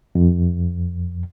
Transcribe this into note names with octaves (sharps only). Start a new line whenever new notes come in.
F2